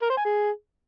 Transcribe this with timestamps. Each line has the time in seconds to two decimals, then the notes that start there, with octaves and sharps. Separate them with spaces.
0.02 A#4
0.10 C5
0.17 G#5
0.25 G#4